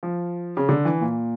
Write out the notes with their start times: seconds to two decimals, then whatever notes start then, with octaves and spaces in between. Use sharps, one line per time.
0.03 F3
0.57 C#3
0.69 D3
0.85 E3
1.01 A#2